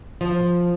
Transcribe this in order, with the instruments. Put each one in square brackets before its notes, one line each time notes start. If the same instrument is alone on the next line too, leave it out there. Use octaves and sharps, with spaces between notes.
[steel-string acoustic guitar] F3